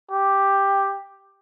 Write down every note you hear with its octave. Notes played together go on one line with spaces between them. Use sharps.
G4